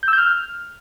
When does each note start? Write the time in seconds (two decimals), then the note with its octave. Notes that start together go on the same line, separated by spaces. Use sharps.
0.03 G6
0.08 E6
0.13 G6
0.18 F6